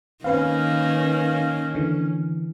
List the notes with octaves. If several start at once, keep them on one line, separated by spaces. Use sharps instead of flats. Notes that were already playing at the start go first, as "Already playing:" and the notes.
D#3 A#3 C#4 B4 F5
D3 E3